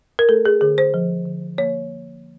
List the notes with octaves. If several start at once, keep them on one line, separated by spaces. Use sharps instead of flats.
A#4
A3 A4
G#4
D3 G#4
C5
F3
D3
A#3 C#5